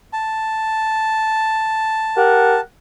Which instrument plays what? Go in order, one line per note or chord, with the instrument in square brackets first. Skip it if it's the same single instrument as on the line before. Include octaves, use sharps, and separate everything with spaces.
[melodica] A5
[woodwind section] G4 A#4 F#5